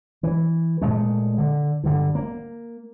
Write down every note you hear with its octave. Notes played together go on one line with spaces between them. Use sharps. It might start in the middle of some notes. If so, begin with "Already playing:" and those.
E3
A#2 G#3 A3
D3
G2 D3
A#3